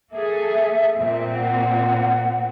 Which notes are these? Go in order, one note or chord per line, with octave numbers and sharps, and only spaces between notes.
A#3 G#4 A4 E5
A#2 C4
F#5